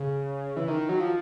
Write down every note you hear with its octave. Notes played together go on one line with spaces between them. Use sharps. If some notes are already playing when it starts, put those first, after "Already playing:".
Already playing: C#3
E3
D#3
F#3
F3